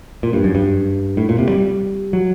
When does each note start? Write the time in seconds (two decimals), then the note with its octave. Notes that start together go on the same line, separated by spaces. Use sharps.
0.23 A#2
0.33 G2
0.44 F#2
0.55 G2
1.17 A2
1.29 A#2
1.38 C3
1.49 G3
2.13 F#3